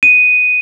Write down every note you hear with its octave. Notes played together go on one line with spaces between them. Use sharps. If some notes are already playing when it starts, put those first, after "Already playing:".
D#7